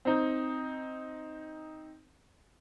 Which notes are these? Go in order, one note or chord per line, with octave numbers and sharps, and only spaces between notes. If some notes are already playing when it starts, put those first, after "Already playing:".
C4 D#4